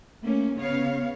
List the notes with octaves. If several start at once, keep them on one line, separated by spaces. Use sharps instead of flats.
A3 A#3 C#4
C#3 B3 C#5 F5